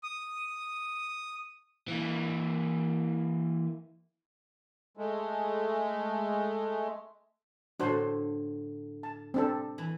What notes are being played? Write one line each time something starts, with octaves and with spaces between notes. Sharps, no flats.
D#6
E3 A#3
G#3 A3
A2 D3 A3 D4 F#4 C5
A5
C4 D4 A4
E3 E4